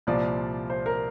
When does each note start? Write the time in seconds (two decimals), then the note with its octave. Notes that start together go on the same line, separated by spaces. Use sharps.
0.07 C2 A#2 F3 D5
0.70 C5
0.86 A#4